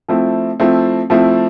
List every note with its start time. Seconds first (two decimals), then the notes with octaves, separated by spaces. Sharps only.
0.09 F3 A3 C4 E4
0.60 F3 A3 C4 E4
1.10 F3 A3 C4 E4